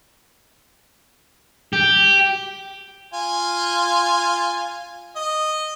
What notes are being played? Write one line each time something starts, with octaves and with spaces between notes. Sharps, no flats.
G4
F4 G#5
D#5